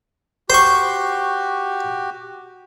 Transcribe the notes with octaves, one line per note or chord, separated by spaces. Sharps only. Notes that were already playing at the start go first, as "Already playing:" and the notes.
F#4 G4 C5 C#6